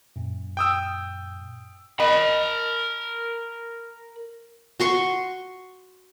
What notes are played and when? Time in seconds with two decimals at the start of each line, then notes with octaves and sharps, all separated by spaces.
0.16 F#2 A#2
0.57 G5 D#6 E6
2.00 A#4 D#5 B5
4.80 F#4 C6 C#6